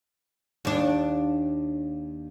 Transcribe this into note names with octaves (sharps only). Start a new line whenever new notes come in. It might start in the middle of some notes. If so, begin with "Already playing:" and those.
D#2 D4